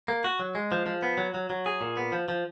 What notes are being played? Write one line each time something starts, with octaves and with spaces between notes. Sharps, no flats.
A#3
F#4
F#3
G#3
F3
F3
B3
F#3
F#3
F#3
G#4
A#2
B3
F3
F3